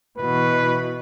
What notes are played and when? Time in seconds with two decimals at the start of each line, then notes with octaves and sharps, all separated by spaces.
0.18 B2 E3 B4